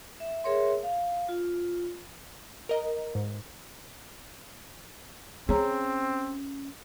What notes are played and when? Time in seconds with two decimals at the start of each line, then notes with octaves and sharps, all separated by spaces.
0.20 E5
0.44 G#4 A#4 C#5 E5 C6
0.83 F5
1.29 F4
2.69 A#4 D#5 A#5
3.15 G#2
5.49 C4 C#4 G#4 C#5 A#5